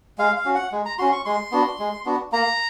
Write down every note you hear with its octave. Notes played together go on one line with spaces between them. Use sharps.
G#3 F5
F5
C#4 F#4
F#5
G#3
A#5
C#4 F#4 C6
C#6
G#3 C6
B3 D4 F#4
G#3
B3 D4 F#4
A#3 A#5